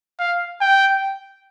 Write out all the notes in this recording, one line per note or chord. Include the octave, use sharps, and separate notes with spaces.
F5
G5